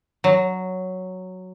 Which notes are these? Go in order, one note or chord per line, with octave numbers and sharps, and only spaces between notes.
F#3